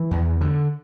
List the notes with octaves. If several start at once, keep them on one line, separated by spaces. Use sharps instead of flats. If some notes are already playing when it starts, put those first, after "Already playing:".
Already playing: E3
E2
D3